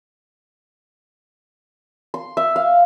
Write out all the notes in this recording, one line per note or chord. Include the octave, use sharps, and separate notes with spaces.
C6
E5
F5